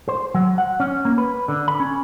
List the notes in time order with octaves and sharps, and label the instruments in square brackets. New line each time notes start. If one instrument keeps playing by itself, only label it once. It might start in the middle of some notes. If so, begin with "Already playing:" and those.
[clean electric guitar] C5
F#3
F#5
C#4
A#3
B4
D3
B5
C#4